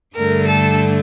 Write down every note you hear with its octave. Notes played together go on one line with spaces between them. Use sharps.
G2 D3 A3 A#4
A4